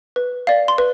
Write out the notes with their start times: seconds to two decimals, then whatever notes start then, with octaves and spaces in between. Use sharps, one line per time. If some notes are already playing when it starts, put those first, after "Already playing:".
0.16 B4
0.47 D5 F5
0.68 C6
0.78 B4